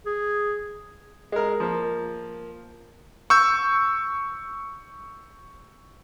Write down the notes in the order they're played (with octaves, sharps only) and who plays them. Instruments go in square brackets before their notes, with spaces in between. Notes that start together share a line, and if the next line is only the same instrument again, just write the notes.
[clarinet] G#4
[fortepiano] G#3 A#4
F3 A#3
[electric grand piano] C#6 E6 G6